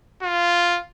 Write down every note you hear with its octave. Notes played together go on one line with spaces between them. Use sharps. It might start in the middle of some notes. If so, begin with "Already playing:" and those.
F4